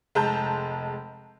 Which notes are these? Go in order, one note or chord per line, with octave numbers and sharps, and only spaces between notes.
F1 G#3 A5 A#5 G6